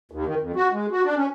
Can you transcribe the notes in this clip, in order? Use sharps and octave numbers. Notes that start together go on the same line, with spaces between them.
D#2
D#3
F2
F#4
G#3
F#4
D4
C#4